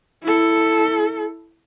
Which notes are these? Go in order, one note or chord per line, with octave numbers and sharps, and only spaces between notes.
E4 A4